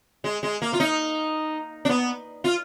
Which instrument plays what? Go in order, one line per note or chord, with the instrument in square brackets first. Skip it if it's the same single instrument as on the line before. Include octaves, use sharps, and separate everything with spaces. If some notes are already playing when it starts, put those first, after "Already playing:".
[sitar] G#3
G#3
A#3
F4
D#4
D4
B3
F4